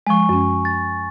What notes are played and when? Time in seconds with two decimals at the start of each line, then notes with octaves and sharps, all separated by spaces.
0.07 F3 G#3 G#5 C#6
0.29 F#2 C#4
0.65 A6